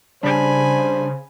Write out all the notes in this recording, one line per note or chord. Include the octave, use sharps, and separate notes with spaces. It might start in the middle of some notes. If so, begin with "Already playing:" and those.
C#3 G3 D4 C5 G#5 B5